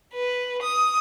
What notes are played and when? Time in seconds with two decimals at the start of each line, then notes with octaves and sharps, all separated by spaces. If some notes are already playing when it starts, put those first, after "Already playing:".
0.15 B4
0.63 D#6